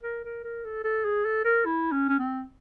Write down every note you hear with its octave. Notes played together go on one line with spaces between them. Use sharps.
A#4
A#4
A#4
A4
A4
G#4
A4
A#4
E4
C#4
C#4
C4